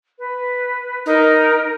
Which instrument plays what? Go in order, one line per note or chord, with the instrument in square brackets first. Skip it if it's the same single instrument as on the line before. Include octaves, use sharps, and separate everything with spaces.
[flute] B4
[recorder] D#4 [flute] A#4